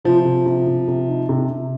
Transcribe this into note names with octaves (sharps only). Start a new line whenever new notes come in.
C3 F3
C3
C3
C3
C3
D#4
C3
C3